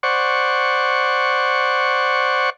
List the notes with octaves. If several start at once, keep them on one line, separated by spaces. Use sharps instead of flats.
C5 D5 F#5 C#6